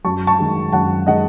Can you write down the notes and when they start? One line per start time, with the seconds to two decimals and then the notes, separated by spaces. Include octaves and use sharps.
0.05 F#2 A5 C#6
0.27 A5 C#6
0.39 D#3 G#3
0.72 F#2 F#5 A5
1.06 D#3 G#3 D#5 F#5